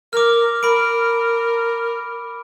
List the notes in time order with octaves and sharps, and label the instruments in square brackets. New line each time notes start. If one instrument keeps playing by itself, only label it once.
[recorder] A#4 [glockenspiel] D6 F6
[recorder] A#4 [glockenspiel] B5 D7